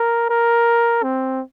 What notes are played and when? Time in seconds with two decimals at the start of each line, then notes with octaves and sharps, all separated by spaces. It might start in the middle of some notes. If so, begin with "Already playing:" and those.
Already playing: A#4
0.29 A#4
1.03 C4